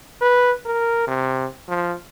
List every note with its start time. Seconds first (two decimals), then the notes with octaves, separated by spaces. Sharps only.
0.22 B4
0.65 A#4
1.07 C3
1.68 F3